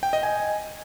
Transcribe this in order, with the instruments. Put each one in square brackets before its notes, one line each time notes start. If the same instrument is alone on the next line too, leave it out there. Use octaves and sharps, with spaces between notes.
[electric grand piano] G5
D#5
G#5